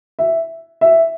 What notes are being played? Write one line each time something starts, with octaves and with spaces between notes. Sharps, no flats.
E5
E5